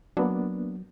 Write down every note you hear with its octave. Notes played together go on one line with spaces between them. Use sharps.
F#3 A#3 B3 D4